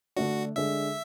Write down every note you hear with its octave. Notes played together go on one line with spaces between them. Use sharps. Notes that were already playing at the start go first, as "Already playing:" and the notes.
D3 A3 D4 F#4
D3 G#3 D4 A4 E5